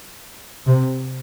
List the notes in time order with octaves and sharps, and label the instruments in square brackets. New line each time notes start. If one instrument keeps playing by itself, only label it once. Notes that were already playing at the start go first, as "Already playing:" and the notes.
[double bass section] C3